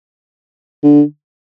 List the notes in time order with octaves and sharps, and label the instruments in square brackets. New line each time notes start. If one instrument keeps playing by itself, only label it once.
[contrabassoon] D3